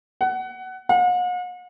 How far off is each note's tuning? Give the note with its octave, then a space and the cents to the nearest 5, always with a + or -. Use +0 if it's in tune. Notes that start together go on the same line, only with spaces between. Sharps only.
F#5 +20
F#5 -45